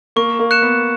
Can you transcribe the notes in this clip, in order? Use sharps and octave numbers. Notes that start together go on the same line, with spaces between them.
A#3 C#6
A#3
F#6 C#7 E7
B3